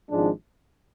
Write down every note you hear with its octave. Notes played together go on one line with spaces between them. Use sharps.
G#1 G#2 F3 G#3 D4